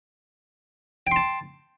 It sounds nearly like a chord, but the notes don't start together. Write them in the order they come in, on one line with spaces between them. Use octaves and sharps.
G5 C6 A5